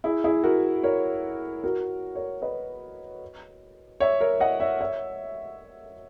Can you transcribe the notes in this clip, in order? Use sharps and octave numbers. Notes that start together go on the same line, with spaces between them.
E4 G#4
E4 G#4
F#4 A#4
A#4 C#5
F#4 A#4
A#4 C#5
B4 D#5
C#5 E5
A#4 C#5
D#5 F#5
C#5 E5
C#5 E5